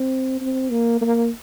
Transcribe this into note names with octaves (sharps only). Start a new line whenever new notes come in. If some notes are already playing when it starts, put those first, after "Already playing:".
Already playing: C4
C4
A#3
A#3